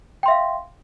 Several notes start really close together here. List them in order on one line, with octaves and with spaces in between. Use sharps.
G5 C6 E5 F5